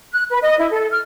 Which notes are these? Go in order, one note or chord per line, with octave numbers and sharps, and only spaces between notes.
F#6
B4
D#5
E4
A4
F6